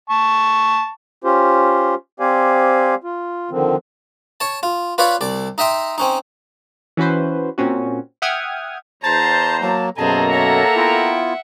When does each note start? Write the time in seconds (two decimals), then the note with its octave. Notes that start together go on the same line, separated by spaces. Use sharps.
0.10 A5 C#6
1.24 C#4 F4 G4 C5
2.20 C4 G4 C5 D5 F5 G#5
3.04 F4
3.51 D3 D#3 F3 C4
4.40 C#5 A5
4.63 F4
4.98 F4 B4 C#5 D5 F5
5.21 C2 D5
5.58 D#4 D#5 E5 G5 C6
5.98 C4 C#4 D#4
6.97 E3 C#4 F#4 B4 C5
7.58 A#2 C4 C#4 F#4
8.22 E5 F#5 G5 D#6 F6 G#6
9.03 E2 C5 A5 A#5 A6
9.62 F#3 A#3 A5
9.98 F#2 B2 A#3 G#4 A4 C5 A5 A#5
10.32 C#5 E5 F#5
10.76 B3 E4 F4 G5